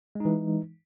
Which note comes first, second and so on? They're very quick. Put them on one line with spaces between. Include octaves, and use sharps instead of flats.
G#3 D#4 E3